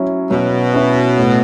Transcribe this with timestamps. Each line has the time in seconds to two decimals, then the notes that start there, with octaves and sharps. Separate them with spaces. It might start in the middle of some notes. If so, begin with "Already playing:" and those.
Already playing: F#3 C#4 E4
0.30 B2 F#3
0.74 C#4 E4
1.18 A2